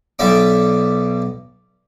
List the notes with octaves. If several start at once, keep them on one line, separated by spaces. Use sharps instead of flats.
B1 B2 D5 E5 D6